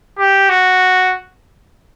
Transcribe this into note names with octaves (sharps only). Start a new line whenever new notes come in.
G4
F#4